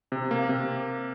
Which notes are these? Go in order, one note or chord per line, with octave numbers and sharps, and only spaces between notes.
C3
A#3
C3